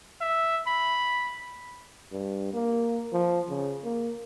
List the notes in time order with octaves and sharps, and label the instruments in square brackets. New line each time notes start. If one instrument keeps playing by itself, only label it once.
[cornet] E5
B5
[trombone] G2
A#3
F3
C#3
A#3